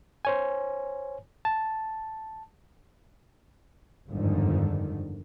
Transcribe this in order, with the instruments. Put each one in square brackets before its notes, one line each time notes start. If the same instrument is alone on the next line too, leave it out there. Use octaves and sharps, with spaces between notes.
[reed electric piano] C5 C#5 G#5
A5
[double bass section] G1 F2 G#2 D3 D#3